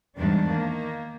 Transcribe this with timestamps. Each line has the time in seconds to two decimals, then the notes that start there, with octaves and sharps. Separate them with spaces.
0.17 E2 G#2 D#3 G3 D4
0.49 D#3 A#3